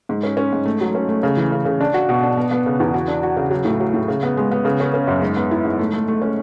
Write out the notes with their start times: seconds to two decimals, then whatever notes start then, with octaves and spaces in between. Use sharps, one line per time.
0.09 G#2
0.23 C#4
0.37 C#4
0.52 G#2
0.65 A3
0.81 F#3
0.95 C#4
1.09 A3
1.23 C#3
1.37 E3
1.52 C#3
1.65 C#3
1.81 D4
1.94 F#4
2.09 B2
2.23 D4
2.37 B3
2.51 B3
2.66 C#3
2.80 E2
2.94 F#4
3.08 D4
3.23 F#4
3.37 C#3
3.51 F#3
3.65 A2
3.80 F#3
3.94 A2
4.08 C#3
4.23 B3
4.37 G#3
4.51 B3
4.65 C#3
4.80 C#4
4.94 C#4
5.07 F#2
5.22 G#2
5.36 B3
5.51 E4
5.65 G#2
5.79 A3
5.93 A3
6.08 A3
6.22 C#4